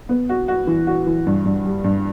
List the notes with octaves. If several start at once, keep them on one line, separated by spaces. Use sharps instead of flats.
B3
F#4
F#4
E3
F#4
E3
G2
G2
G3
G2